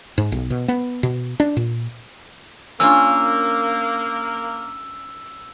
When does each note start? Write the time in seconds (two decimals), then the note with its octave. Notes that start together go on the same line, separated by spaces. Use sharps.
0.18 G#2
0.32 B1
0.50 B2
0.68 B3
1.03 B2
1.40 D4
1.57 A#2
2.80 A#3 C#4 D4 F4 E6